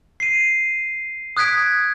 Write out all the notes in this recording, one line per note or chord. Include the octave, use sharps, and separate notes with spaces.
C7 D#7
D#6 F#6 G#6 B6 D7